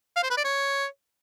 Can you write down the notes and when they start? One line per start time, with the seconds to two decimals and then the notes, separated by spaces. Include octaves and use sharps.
0.16 F5
0.23 C5
0.30 B4
0.37 D5
0.44 C#5